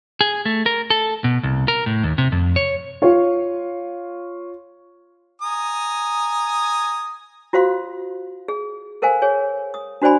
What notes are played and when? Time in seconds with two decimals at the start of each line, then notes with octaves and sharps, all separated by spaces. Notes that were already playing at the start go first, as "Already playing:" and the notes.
0.21 G#4
0.45 A3
0.66 A#4
0.90 A4
1.24 B2
1.43 C2
1.68 A#4
1.86 A2
2.03 D#2
2.18 C3
2.32 F2
2.56 C#5
3.02 F4 C#5
5.42 G#5 A#5 D#6
7.53 F4 F#4 C5 F5 C6
8.48 G#4
9.02 A4 A#4 C5 F5 G#5
9.22 G#4 C#5 G#5
9.74 D#6
10.02 D4 F#4 C5 D5 G#5 B5